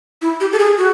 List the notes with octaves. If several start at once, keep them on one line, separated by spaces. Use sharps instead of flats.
E4
G4
A4
G#4
F#4